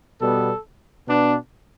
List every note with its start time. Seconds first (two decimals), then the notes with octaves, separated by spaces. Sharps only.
0.20 B2 G3 B3 A4
1.06 B2 B3 D4